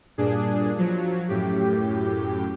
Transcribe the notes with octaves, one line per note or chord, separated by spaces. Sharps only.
G2 A#2 D4 G#4
F3 F#3
F#2 A2 G4